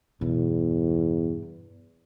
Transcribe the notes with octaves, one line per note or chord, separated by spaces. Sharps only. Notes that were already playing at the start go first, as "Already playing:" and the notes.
E2 G2 B2